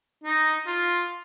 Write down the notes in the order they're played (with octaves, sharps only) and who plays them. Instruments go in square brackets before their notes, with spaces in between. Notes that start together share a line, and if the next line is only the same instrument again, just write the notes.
[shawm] D#4
F4